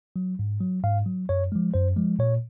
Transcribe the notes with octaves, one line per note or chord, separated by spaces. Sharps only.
F#3
G#2
F#3
G#2 F5
F#3
F#2 C#5
F3 G#3
F#2 C5
F3 G#3
A#2 C#5